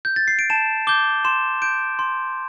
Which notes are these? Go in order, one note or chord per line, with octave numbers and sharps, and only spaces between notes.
G6
A6
C7
D7
A5 E7
D6 G6 G7
C6 E7
G6 D7
C6